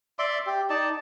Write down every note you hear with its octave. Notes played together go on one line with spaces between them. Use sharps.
D5 E5 C6 D6
G4
D#4 D5 A5